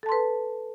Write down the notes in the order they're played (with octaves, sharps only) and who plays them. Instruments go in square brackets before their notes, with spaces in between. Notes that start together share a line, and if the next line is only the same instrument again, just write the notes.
[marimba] A4
A5
C6
B4